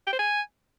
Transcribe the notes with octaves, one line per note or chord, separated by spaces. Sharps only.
G5
C5
G#5